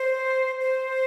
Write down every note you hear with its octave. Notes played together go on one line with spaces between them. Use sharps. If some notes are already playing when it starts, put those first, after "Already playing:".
Already playing: C5
C5